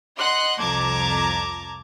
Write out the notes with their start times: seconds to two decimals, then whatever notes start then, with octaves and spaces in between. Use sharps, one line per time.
0.18 D#5 F#5 C6 F#6
0.60 C2 F2 A5 A#5 D6 G#6